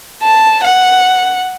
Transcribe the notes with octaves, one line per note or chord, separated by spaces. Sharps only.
A5
F#5